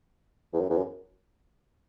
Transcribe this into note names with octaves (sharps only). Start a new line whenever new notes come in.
E2
F#2
E2
F#2